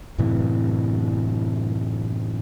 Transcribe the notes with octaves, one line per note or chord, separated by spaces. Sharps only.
F#2 A2 C3 E3